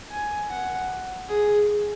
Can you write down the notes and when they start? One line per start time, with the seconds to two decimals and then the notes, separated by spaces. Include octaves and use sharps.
0.11 G#5
0.50 F#5
1.28 G#4